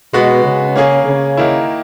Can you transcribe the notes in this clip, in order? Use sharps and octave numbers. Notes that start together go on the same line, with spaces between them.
B2 G#3 B3 F#4
C#3
A#3 C#4 G#4
C#3
D#3 A#3 E4